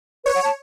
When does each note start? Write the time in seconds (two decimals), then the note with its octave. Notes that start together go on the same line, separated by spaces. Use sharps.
0.25 B4 C#5
0.35 F#5
0.44 A5